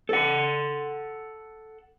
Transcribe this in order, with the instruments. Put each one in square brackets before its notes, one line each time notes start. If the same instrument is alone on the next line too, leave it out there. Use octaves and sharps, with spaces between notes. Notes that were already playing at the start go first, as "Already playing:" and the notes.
[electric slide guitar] A4 F#5